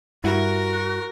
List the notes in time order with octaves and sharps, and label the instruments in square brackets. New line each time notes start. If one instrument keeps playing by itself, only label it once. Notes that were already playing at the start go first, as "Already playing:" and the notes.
[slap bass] G2 [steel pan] E4 F#5 [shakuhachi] F#4 [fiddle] A#4